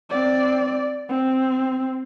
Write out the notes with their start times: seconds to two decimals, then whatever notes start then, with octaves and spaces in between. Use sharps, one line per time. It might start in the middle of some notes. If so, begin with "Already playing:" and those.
0.10 C4 D5
1.09 C4